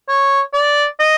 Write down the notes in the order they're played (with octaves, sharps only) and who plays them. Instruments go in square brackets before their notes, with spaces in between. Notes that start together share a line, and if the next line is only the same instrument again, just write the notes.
[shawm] C#5
D5
D#5